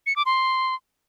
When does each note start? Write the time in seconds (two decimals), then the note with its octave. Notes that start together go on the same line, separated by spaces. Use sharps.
0.06 C#7
0.16 D6
0.26 C6